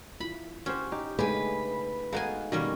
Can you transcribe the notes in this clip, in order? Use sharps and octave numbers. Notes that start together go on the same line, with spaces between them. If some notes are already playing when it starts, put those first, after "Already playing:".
E4 F4 B5
C#4 F#4 G4 C5
D#4 G4
C#3 G#3 A3 D4 G4 A4 B4 G#5
G#3 B3 D#4 F#4 A4 F5 G#5
B2 D#3 G3 A#3 C#4